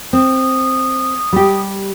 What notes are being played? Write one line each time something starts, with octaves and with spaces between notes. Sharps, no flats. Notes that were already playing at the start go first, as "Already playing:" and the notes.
C4 D#6
G3 G4